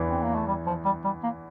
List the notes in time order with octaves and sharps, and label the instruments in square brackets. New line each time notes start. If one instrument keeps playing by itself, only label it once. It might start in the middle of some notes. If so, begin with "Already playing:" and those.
Already playing: [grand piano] E2 E3
[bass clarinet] C4
A#3
A3
G3
F3
G3
G3
A#3